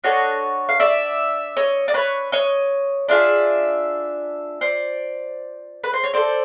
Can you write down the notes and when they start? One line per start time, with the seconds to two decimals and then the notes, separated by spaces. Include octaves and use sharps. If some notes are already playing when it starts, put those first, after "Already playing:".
0.04 D4 F#4 A4 C#5 D#5
0.69 F5
0.80 D5 E5
1.57 C#5 D#5
1.88 D5
1.94 B4 C#5
2.32 C#5 D#5
3.09 D4 F4 G#4 D5 E5
4.61 C5 D5
5.84 B4
5.93 C5
6.04 C#5
6.13 C4 E4 A4 C5 D5